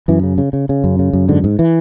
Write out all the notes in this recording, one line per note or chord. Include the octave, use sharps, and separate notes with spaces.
F#2 E3
C#3
C#3
C#3
C#3
F#2
C#3
F#2
G#2 D3
G#2
E3